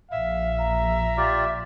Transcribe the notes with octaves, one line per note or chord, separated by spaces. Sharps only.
A#1 E5 F5
A#5
F4 G4 D5